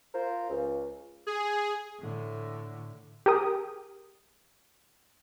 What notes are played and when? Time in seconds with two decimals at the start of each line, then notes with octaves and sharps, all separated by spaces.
0.14 F4 A#4 C5
0.49 C#2
1.27 G#4
1.99 A2 D3
3.26 G4 G#4 A#4 D#6